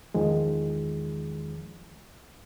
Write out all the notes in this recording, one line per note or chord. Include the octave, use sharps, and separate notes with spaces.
E2 D#3 F3 G#3